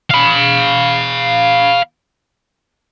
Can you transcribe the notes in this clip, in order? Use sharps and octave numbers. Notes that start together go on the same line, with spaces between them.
F5 B5